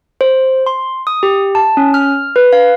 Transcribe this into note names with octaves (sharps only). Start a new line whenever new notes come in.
C5
C6
D#6
G4
A5
C#4
F6
B4
F5